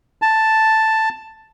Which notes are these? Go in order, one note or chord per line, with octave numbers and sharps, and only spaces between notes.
A5